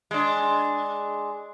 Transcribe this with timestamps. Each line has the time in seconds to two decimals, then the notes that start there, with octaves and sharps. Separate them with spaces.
0.11 G#3 D4